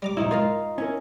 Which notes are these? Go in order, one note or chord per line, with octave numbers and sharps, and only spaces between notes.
G3 A#5 D6
A#1 E2 G2 D#4 E4
G#2 F4 A#4 D#5 F5
C#4 E4 A#4